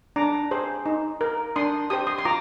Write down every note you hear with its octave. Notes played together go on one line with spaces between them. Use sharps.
D4 A#5 D6
G#4 C5
D#4
A#4
D4 C6 D#6
G4 C5 D#6
C6 D#6
C6
F4 A#5 D6